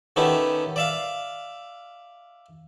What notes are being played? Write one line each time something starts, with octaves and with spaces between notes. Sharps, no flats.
D#3 A3 B3 C#4 G4
D5 E5 F5